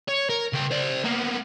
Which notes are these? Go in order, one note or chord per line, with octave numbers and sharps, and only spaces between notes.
C#5
A#4
C#3 G5
C5 D5
A#3 B3